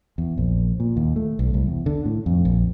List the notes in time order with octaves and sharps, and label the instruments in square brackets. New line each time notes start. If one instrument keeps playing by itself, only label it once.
[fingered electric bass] E2
A#1
A#2
D#2
A3
B1
C2
E2
D3
A2
F2
A#1